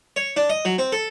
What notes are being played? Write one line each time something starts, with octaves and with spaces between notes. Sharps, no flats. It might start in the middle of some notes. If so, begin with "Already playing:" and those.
C#5
D4
D#5
F#3
C4
A4